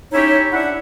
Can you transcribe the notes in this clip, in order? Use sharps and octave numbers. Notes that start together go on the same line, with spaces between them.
C#4 D#4 E4 G4 C#5
D4 E4 E5 F#5